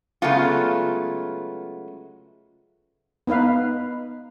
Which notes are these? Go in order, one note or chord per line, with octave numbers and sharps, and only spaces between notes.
C#3 F#3 G#3 A3 B3 F4
B3 D#4 B4 F5